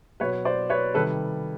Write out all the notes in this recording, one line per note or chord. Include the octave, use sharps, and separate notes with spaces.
B2 F#3 B4 C#5
C5 D5
B4 C#5
C3 D#3 G3 A4 B4